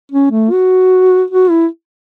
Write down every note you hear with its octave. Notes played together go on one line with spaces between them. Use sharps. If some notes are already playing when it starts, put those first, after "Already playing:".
C#4
A3
F#4
F#4
E4